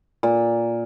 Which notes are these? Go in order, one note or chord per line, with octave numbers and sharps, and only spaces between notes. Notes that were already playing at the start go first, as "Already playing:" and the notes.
A#2